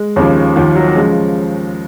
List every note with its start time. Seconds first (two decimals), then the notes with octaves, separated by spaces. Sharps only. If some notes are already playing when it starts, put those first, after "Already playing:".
Already playing: G#3
0.16 D#2 C#3 F3
0.56 D#2 D#3 F3
0.75 F#3
0.88 F#3
0.95 C#3 F3 G#3